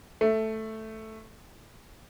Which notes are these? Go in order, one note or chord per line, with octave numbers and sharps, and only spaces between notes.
A3